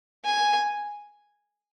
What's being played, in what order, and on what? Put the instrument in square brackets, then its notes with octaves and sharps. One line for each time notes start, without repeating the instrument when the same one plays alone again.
[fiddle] G#5